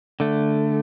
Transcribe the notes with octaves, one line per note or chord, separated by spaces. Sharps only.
D3 A3